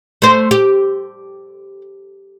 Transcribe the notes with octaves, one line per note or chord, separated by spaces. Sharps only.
A3 C5
G4